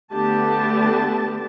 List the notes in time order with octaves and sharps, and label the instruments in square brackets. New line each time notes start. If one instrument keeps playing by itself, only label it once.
[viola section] D3 A3 B3 D4 G4 A5